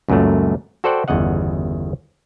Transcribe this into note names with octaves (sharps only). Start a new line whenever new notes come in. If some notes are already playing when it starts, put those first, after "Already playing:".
C#2 F#2 A#2 F#3 A3
F#4 A4 C5 D5 F#5 G5
G1 E2 C#3 D#5 F#5